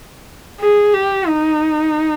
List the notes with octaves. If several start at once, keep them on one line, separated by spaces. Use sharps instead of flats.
G#4
G4
D#4